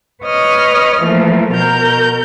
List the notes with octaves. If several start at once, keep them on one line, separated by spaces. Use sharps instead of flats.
B4 C#5 D#5 D#6 F6
E3 F3 A3 A#3
B2 A#4 A#5 G6